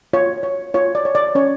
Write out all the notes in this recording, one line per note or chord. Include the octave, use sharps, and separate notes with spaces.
F4 C#5
C#5
F4 C#5
D5
C#5
D5
C#4 C#5